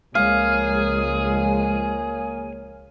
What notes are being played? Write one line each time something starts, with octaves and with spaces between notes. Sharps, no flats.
C#2 F3 G#3 A#3 G#4 C#5 F5